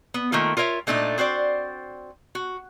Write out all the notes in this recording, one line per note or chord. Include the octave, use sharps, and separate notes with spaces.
B3
D#3 A3 A#3 F4
F4 A#4 C#5 D#5 E5
A#2 A3 D4 D#4 A4
C4 F#4 C5 D5
F#4